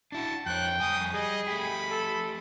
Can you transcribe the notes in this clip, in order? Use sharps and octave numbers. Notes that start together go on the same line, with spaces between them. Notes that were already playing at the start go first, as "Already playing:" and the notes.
D4 E4 F#4 A5
F2 C#5 G5 F#6
F2 G3 G#5 D#6
G3 G#4 D#5
A3 G4 B5
A4